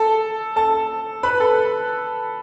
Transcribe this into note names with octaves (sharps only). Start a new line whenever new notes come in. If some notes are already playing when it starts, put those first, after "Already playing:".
Already playing: A4 A5
A4 A5
B4 B5
A4